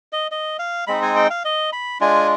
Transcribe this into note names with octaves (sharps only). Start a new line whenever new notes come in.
D#5
D#5
F5
G#3 C4 D#4 B5
G#5
G5
F5
D#5
B5
G#3 D4 F4 G#5